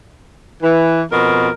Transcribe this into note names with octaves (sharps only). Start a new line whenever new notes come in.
E3
F2 B2 A#4